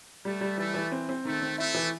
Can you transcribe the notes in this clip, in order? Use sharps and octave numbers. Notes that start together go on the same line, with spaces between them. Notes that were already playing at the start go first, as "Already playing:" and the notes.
G3 A3
G3
E3 A3
E3
C4
C4
D#3 A3
C4
A3 E4
E3